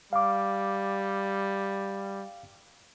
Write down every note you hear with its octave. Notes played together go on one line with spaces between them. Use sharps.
G3 F5 D6